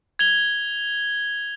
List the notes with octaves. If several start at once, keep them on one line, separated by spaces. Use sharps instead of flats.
G#6 F7 G7